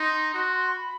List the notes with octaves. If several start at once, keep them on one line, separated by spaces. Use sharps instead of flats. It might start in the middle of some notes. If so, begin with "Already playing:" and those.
Already playing: D#4 C6
F#4
B5